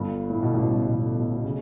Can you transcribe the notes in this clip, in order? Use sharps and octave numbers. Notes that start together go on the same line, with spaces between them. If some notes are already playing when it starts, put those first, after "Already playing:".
Already playing: G1 G2
A2
B2
A1 A2
G1 G2
B2
A1 A2
B1 B2
B2
C#3